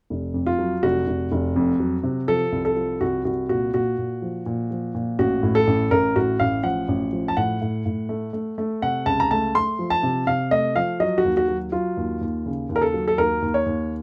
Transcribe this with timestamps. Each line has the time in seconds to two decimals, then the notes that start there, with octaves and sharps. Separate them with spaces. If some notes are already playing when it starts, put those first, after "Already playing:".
0.10 F1
0.34 F2
0.46 F4
0.59 F#3
0.83 F1 F#4
1.07 F1
1.32 F1
1.56 F2
1.80 F#3
2.03 C3
2.28 F3 A4
2.52 C2
2.65 A4
2.76 F3
3.01 C2 F#4
3.25 C2 F#4
3.49 A#2 F#4
3.74 A#2 F#4
3.98 A#2
4.22 F3
4.46 A#2
4.71 F3
4.95 A#2
5.19 A1 F#4
5.43 A2
5.55 A4
5.67 A1
5.91 A1 A#4
6.16 A2 F#4
6.40 A1 F5
6.64 F3 F#5
6.88 A1
7.13 F3
7.28 A5
7.37 A2 F#5
7.62 A2
7.86 A2
8.09 A3
8.33 A3
8.58 A3
8.82 C3 F#5
9.06 C#2 A5
9.20 A#5
9.31 A3 A5
9.55 A3 C6
9.79 F3
9.90 A5
10.03 C3
10.27 C3 F5
10.51 A3 D#5
10.76 F3 F5
11.00 F#3 D#5
11.18 F#4
11.24 D#2
11.37 F#4
11.48 F#3
11.72 F#3 F4
11.97 D#2
12.21 D#2
12.46 C#3
12.69 D#2
12.76 A#4
12.82 A4
12.94 F#3
13.08 A4
13.18 D#2 A#4
13.42 D#2
13.54 C#5
13.66 D#2